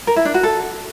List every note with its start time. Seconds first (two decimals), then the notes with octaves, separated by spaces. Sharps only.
0.07 A#4
0.16 E4
0.25 D4
0.34 F#4
0.43 A4